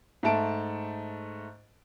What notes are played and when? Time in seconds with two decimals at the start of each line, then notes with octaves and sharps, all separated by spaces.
0.23 G#2 A3 A5 D7